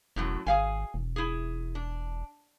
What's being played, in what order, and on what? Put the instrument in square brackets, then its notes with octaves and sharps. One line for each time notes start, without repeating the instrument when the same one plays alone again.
[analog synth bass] E1 [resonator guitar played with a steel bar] F#2 A2 F#3
[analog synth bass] G#1 [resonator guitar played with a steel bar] G#4 F5 G#5
[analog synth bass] E1
[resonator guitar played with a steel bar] E4 G#4
D4